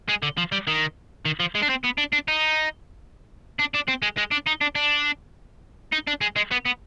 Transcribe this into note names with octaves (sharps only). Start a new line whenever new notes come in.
G#3
D3
F3
G3
D#3
D#3
F3
G#3
D4
C4
B3
D4
D4
D#4
D4
D4
C4
G#3
G#3
D4
D#4
D4
D4
D#4
D4
G#3
G#3
B3
B3